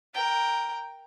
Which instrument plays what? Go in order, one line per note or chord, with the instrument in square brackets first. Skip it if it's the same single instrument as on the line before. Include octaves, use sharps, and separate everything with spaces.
[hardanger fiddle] A#4 G5